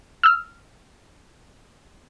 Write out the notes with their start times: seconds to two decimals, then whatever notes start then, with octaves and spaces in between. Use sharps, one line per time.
0.23 E6 F6